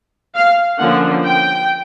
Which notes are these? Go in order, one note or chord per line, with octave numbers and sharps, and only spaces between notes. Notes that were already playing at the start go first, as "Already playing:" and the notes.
F5
D3 F3 A#3 C#4 F#5
G5